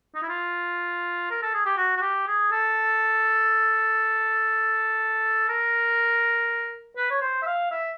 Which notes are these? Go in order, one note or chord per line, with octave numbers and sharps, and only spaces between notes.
D#4
E4
F4
A#4
A4
G#4
G4
F#4
F#4
G4
G#4
A4
A#4
B4
C#5
C5
E5
F5
E5